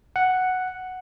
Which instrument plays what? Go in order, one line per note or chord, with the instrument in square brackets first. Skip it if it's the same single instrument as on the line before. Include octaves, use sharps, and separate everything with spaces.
[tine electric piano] F#5